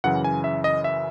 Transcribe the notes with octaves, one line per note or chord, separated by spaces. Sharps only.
F#2 C#3 E3 F#5
G#5
E5
D#5
E5